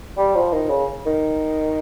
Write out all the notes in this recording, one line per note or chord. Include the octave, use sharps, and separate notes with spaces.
G3
F3
D#3
C#3
D#3